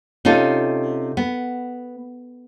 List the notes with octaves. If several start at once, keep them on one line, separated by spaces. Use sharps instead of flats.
C3 C#4 D#4 F4 A4
B3